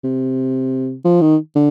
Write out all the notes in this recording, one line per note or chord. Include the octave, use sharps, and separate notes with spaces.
C3
F3
D#3
D3